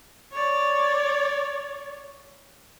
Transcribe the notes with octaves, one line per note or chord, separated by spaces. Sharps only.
C#5 D5